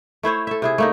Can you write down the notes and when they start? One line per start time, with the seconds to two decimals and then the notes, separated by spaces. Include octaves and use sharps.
0.23 A3 E4 C5 C#5
0.47 A4 E5
0.62 C3 E4 G#4
0.78 A3 A#3 D#4